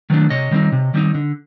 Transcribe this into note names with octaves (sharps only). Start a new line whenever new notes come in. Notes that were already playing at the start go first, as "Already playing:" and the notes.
D#3 F#3 A3 D4
C3 C#5 D#5
D#3 G3 C4 D#4
C3
D#3 G3 C4 D#4
D3